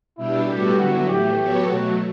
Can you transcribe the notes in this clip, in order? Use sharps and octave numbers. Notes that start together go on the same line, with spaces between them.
B2 G3 D4 E4 G4
A2 G3 B3 F#4 G4 A4
D3 F#3 B3 E4 F#4
A2 E3 A3 G4
F#3 B3 F#4 A4 C#5
B2 F#3 A3 F#4